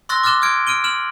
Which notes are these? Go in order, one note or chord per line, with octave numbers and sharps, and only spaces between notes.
C6 C#6 E6 F#6 A6 A#6
D6 F6 F#6 A6 E7 G7
D#6 F6 G#6 D7
F6 D7 D#7 G7
F6 E7 F#7